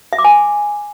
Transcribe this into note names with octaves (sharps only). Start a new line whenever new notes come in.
E5
D6
G#5